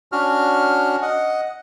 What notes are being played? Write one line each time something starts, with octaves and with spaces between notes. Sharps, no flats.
C#4 D4 F#4 F6
D#5 F#5